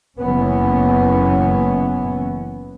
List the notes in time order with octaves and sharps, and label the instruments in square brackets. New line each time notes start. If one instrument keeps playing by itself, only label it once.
[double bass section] F#1 E3 B3 C#4